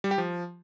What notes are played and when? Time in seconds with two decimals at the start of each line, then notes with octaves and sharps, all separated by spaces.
0.04 G3
0.11 G4
0.18 F3